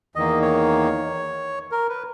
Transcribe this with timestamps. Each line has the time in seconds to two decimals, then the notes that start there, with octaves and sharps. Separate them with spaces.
0.16 E2 D#3 A#3 D#5
0.42 C#5
1.71 A#4
1.89 B4